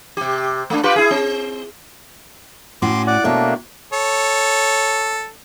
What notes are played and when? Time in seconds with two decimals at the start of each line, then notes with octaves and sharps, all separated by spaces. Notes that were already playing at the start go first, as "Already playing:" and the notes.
0.17 C3 G4
0.70 A3 D4
0.83 F4 G4 B4
0.96 E4 G#4
1.11 C4
2.82 A2 C#4 F#4 C6 D6
3.07 D5 F#5 D6
3.24 B2 A3 A#3 D4 C#5 G5
3.93 A4 C#5